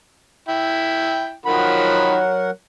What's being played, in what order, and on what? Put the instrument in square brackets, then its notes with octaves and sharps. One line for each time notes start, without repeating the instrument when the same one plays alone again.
[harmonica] E4 G5
[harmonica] D#3 F3 B5 [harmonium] F#3 A#4 F#5